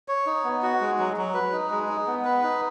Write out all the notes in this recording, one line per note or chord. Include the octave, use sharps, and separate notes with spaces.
C#5
D#4
B3
F#4
G#3
F#3
F#3
B4
D#4
G#3
D#4
B3
B4
D#4